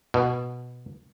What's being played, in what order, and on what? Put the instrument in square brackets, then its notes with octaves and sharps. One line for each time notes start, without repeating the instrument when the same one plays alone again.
[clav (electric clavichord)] B2